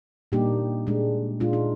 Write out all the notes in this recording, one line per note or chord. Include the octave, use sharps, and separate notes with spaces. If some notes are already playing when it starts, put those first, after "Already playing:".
A#2 G3 A#3 D4 D#4 G4
A#2 G#3 D4
A#2 G#3 D4 F4
D#4